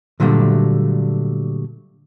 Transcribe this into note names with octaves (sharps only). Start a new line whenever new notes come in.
A#2 D3 F#3 G3 A3